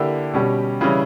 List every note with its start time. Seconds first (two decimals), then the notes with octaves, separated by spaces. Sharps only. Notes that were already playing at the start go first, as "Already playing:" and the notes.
Already playing: D3 A#3 E4 G4
0.33 B2 G3 C#4 G4
0.81 C#3 E3 G3 C#4 E4